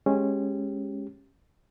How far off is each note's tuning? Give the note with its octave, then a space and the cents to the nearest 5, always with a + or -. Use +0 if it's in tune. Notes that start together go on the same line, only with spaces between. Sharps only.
G#3 +0 C#4 -15 G4 +0